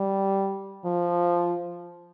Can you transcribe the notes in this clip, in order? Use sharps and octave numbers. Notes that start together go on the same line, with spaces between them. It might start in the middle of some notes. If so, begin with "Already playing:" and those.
Already playing: G3
F3